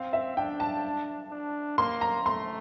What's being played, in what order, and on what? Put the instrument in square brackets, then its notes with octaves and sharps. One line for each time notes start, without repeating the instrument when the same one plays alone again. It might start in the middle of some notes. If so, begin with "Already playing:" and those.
Already playing: [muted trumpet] C4 [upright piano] F5
[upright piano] E5
[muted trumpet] D4 [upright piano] G5
[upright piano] A5
[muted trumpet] D4
[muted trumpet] A#3 [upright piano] C6
[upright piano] A#5
[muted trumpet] A3 [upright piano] C6